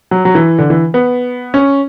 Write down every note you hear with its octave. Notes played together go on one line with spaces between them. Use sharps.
F#3
F#3
E3
D3
E3
B3
C#4